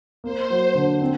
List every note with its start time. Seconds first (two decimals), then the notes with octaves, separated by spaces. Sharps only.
0.24 A#3 C5
0.50 F#3
0.75 D3
1.02 C4